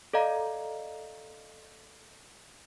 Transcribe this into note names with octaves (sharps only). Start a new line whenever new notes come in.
A4 D5 D#5 F5 A#5